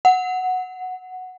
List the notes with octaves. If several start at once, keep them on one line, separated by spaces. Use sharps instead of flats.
F#5